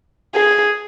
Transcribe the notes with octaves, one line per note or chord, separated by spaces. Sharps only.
G#4